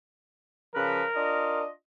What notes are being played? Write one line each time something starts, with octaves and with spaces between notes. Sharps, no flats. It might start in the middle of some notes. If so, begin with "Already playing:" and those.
C#3 F3 A#4 B4
D4 F4 D#5